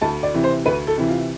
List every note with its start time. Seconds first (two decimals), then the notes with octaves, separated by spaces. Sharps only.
0.01 D2 A5
0.23 D5
0.34 C3 E3
0.44 C5
0.66 D2 B4
0.87 A4
0.98 C3 E3
1.09 F4